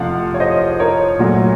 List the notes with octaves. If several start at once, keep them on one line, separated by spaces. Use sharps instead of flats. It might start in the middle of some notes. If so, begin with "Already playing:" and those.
Already playing: F2 C3 F3 A3 F5 F#5
C#5
C5 D#5
A#4 C#5
A#2 F#3 A3